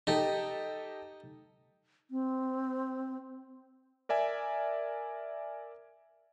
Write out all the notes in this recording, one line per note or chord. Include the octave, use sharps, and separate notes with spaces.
D#4 G4 A4 D#5
C4
A#4 D5 E5 G#5